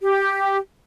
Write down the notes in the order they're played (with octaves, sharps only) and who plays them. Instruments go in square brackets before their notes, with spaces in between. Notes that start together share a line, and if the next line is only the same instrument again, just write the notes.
[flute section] G4